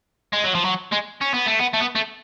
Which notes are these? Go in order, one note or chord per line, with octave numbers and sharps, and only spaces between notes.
G#3
F#3
F3
F#3
G#3
C#4
B3
A3
B3
A3
B3
A3